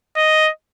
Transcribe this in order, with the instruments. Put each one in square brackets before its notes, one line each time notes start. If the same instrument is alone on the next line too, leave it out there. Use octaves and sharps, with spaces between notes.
[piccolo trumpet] D#5